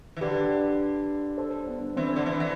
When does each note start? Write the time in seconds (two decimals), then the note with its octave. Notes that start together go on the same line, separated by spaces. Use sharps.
0.17 E3
0.21 D3 G4 B4
1.38 A4 C5
1.67 B3 D4
1.97 E3 C4
2.16 D3
2.26 E3
2.40 E3